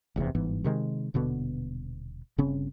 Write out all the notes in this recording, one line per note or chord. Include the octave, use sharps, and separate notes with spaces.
F1 E2 G#2 C3
G1 G#2 E3 B3
C3 D#3 G#3
D#1 B2 D3 B3
G1 C#3 C4 C#4